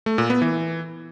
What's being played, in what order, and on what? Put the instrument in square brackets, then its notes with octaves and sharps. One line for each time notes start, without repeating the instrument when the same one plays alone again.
[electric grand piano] A3
A#2
B3
E3